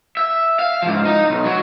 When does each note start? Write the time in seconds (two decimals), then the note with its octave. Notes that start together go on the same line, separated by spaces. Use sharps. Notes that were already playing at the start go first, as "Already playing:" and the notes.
0.17 E5
0.59 F5
0.82 G#2 F3
1.05 D#4
1.30 B1
1.45 F#3